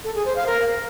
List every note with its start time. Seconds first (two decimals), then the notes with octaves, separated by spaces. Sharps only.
0.04 A4
0.15 G#4
0.25 C5
0.36 F5
0.46 A#4